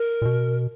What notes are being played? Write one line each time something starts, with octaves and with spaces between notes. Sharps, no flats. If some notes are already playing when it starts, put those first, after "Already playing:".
Already playing: A#4
A#2
B2